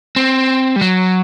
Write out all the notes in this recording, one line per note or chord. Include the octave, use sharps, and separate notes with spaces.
C4
G3
F#3